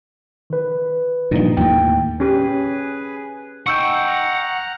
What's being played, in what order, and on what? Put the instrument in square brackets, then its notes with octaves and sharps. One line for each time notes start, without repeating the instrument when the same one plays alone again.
[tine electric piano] D#3 B4
[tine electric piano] G2 D#4 [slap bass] A#2 F3
[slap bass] D#2 A2 [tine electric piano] G5
[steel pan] C#4 G4 [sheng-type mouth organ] G#4 B4
[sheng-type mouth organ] D#4 [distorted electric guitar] F#5 G5 [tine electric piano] C#6 E6 G6
[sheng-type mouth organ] A#5 F6 F#6